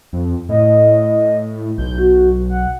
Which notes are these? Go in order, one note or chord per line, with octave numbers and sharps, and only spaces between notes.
F2
A2 D#5
B1 G6
F#4
F#5